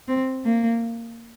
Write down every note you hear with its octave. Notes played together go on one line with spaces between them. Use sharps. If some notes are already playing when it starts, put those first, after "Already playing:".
C4
A#3